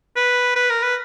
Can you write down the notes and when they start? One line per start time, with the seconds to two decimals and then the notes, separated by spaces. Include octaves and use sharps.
0.17 B4
0.56 B4
0.70 A#4
0.83 B4